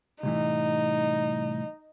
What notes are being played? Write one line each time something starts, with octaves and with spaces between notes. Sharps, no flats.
C2 A2 E3 D#4